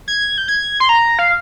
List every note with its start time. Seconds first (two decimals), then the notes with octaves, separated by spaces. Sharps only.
0.08 G#6
0.38 G6
0.48 G#6
0.80 C6
0.89 A#5
1.19 F5